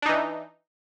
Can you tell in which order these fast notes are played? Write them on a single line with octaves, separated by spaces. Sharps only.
D4 D#4 E3